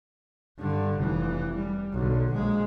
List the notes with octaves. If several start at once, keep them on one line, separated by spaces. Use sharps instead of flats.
G2 D3
F1 E3
G3
B1 D3
A#1 G#3